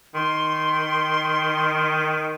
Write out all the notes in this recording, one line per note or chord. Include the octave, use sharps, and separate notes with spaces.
D#3 C6